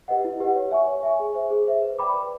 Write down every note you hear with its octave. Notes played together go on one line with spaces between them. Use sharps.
G4 B4 D#5 F#5
E4
G4 B4 D#5 F#5
C#5
E5 G#5 C#6
C#5
E5 G#5 C#6
G#4
C5 E5
G#4
C5 E5
B4
D5 G5 B5 D6
B4